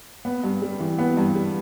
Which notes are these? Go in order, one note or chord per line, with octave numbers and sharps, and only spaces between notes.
B3
G2
G3
E3
B3
G2
G3